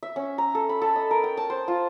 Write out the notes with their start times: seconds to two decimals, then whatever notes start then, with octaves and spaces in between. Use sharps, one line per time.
0.03 E5
0.16 C#4
0.38 A#5
0.55 A4
0.69 B5
0.81 A4
0.96 D#5
1.11 A#4
1.24 G5
1.37 A5
1.50 C5
1.68 F4